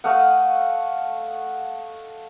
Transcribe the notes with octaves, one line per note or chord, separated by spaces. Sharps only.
A3 D#5 F5 F#5